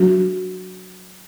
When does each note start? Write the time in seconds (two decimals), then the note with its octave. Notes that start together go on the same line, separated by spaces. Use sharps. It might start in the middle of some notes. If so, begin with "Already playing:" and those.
Already playing: F#3 D4 F#4